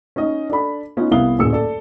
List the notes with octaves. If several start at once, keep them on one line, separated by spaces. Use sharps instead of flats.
C#4 D#4 D#5
D4 A4 B5
B3 C#4 D#4 F4
C2 B3 E4 F5 D#6 G7
D1 F#2 A#2 G#4 E6 C#7
A4 D5